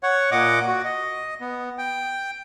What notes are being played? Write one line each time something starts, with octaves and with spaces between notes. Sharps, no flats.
C#5 F#5
A#2 D#5 F#5 D6
F#4
D#5
B3
G5